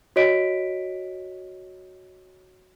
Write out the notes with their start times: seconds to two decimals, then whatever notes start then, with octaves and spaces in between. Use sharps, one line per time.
0.16 F#4 C#5 D#5 B6 D7